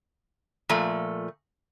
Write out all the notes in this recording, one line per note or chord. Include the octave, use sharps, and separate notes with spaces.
A#2 F3 A3